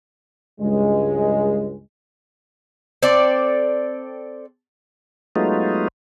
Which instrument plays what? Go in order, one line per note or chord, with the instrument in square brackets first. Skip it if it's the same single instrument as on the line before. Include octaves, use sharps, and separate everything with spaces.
[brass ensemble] C#2 G2 C#3 G#3
[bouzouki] C4 A4 D5
[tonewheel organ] F#3 G#3 A3 B3 D#4 F4